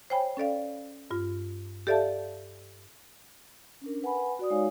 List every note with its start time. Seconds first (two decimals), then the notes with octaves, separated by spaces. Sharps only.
0.10 C5 C#5 G5 G#5 B5
0.37 C#4 A4 D5 F5
1.11 G2 F4
1.87 G4 A4 D5 E5 F5 A5
3.82 C#4 D4 A#4
4.02 B4 F#5 G#5 B5
4.39 F#4 D5 D#6
4.50 G#3 D#4 F#4 C#5 F5 G#5